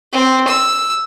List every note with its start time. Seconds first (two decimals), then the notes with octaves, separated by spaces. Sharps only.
0.13 C4
0.47 E6